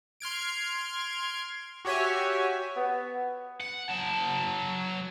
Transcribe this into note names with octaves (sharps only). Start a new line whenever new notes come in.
C6 F6 G#6 D7
F#4 G4 C#5 E5 G#5
B3
F#5
F#3 A5